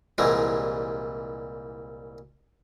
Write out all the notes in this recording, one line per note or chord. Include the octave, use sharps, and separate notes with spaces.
C2 A#2 E3 G3 G#3